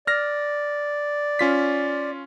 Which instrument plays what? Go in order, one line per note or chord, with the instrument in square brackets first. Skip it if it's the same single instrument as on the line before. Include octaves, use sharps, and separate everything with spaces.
[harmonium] D5 [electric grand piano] F6 A#6
[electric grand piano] C#4 F4 B6